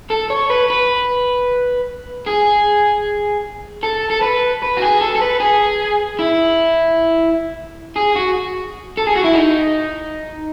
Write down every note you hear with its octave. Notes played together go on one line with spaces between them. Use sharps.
A4
C#5
B4
B4
G#4
A4
A4
B4
B4
F#4
G#4
A4
A4
B4
G#4
E4
G#4
F#4
A4
G#4
F#4
E4
D#4